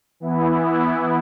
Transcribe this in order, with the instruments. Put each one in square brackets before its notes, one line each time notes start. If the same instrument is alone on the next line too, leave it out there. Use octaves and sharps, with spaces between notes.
[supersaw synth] E3 B3 E4